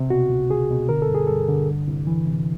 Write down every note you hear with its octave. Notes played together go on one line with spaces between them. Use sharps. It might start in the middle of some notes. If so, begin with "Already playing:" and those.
Already playing: C3
B2 F#4
C#2
C#2 G#4
B2
D3 A#4
A4
G2
G#4
G2 A4
D3
C2
C2
E3
C3